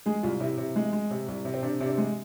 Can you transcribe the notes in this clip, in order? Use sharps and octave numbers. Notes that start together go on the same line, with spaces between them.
G#3 G#4
C2 F4
C3 E4
C3
G#3
G#3
C3
C2
C3
C4
C3 D4
C3 D4
C4
G#3